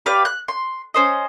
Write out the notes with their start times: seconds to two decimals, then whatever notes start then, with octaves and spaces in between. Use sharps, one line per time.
0.06 G4 B4 D5 F5
0.25 F#6
0.48 C6
0.94 C#4 C5 D#5